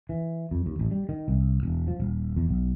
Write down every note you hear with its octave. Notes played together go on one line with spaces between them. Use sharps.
E3
F2
D#2
A1
G3
D#3
C2
E1
F3
D#1
E2
B1